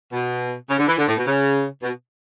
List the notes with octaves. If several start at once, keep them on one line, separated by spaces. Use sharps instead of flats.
B2
C#3
D3
E3
D3
A2
B2
C#3
B2